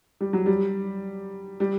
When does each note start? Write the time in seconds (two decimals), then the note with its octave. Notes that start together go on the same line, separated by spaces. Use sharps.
0.21 G3
0.33 F#3
0.46 G3
1.60 G3